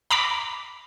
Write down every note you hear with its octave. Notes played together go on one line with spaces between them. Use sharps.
A#5 B5 D6 B6